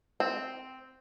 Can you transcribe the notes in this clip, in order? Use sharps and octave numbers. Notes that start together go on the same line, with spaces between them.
C4